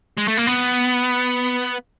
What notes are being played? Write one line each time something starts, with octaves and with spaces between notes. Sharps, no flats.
G#3
A3
A#3
B3